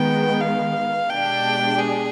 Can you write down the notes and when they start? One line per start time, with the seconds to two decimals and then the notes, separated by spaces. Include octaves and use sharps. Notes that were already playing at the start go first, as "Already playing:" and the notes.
Already playing: D#3 G#3 B3 G5
0.41 F5
1.10 B2 G#3 D4 G4 G5
1.79 G#4